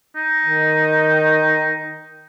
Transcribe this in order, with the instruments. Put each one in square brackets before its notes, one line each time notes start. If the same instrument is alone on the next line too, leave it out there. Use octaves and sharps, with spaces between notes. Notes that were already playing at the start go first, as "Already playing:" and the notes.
[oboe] D#4
[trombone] D#3